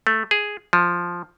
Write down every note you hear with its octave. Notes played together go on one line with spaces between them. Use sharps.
A3
G#4
F3